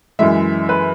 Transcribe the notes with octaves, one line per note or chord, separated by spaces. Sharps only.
F#2 E3 G#3 E5
B4